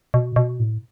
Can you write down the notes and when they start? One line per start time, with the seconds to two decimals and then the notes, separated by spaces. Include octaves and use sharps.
0.14 B2
0.36 B2
0.60 A2